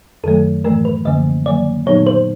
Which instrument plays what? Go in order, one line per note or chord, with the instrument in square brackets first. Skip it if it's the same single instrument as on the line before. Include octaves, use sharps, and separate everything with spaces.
[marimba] F#2 D#3 F#3 A3 [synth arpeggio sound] A4
[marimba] A2 E3 A3 [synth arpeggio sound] A#4
[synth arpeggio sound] B4
[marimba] F#2 D3 F3 A#3 C#4 [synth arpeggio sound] D#5
[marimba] D#3 F#3 A#3 [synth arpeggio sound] D5
[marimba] A#2 F#3 B3 D#4 G4 [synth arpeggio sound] C#5
[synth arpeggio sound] C5